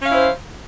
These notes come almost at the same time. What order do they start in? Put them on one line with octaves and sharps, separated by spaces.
C#4 F5 E4 C5